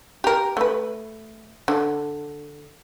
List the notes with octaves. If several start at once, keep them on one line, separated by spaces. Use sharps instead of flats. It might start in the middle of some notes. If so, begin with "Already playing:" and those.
G4 A#4
A3 B4
D3